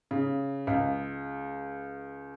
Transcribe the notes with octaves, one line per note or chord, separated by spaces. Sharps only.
C#3
C#2